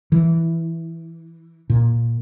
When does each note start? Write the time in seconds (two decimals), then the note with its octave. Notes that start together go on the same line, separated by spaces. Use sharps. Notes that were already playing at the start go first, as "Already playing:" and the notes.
0.12 E3
1.70 A#2